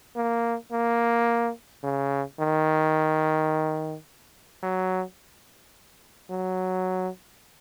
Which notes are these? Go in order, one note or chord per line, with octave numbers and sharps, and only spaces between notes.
A#3
A#3
C#3
D#3
F#3
F#3